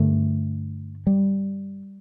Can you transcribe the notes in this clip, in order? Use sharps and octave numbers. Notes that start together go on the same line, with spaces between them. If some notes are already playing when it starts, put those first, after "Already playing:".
Already playing: G2 D3 A3
G3